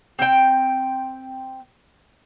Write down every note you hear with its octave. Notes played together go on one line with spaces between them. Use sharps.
C4 G5